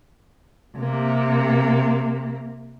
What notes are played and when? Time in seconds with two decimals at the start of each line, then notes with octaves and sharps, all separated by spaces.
0.77 C3 A#3